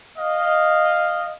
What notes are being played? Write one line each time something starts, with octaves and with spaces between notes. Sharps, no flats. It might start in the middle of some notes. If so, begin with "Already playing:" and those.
D#5 F5